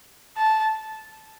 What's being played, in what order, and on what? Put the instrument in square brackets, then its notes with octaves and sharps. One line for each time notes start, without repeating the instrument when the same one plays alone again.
[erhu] A5